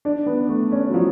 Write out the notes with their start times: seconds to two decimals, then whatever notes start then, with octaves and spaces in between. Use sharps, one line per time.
0.05 D4
0.26 B3
0.49 A3
0.72 C#4
0.90 F#3
0.94 F3